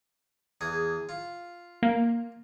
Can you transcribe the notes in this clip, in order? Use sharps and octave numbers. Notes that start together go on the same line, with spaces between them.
E2 G#4
F4
A#3